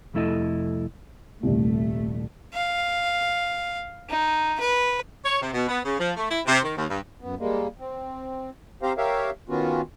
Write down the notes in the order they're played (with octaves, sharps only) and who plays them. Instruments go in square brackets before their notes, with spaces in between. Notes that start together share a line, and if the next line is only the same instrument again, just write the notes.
[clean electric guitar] C2 F2 A3 E4 A4 D#5
[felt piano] D#1 C2 [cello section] A3
[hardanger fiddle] F5
D#4
B4
[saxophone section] C#5
C3
B2
B3
C#3
F3
A3
E4
C3
D#3
D#2
G2
[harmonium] F#2 B3
G3 G#3 A#3
C4
C4 G4 C5 F5 A#5
G4 A#4 C#5 E5 F5
D#3 B3 C#4 F4 F#4